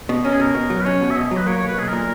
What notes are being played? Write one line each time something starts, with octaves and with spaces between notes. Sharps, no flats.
B2
C#4 A#4
G#4
B2 A#4
B2
F#3
B4
C#4 C#5
B2
E5
B2 D#5
F#3
B4
A#3 C#5
B1 C#5
B4
B1 G#4
A#4
A#2